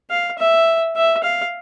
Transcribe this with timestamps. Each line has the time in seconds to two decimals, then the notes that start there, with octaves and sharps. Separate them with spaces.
0.10 F5
0.39 E5
0.96 E5
1.23 F5